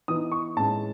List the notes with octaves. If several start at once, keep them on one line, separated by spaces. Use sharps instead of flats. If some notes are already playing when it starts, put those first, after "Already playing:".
E3 B3 D#4 D#6
C#6
A2 G#3 C#4 A5